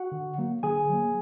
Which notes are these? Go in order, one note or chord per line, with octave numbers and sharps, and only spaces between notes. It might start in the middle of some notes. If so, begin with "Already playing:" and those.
Already playing: F#4 F#5
D3
F#3 A#3
D3 G#4 G#5
F#3 A#3